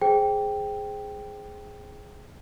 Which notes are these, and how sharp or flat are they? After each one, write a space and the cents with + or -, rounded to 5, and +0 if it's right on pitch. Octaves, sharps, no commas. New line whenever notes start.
G#4 +0 C5 +0 G5 +0